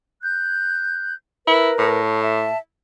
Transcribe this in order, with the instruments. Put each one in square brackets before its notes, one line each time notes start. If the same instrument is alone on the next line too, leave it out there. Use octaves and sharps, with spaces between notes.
[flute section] F#6 G6
[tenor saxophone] E4 [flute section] A#4 B4
[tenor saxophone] A2
[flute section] E5 A5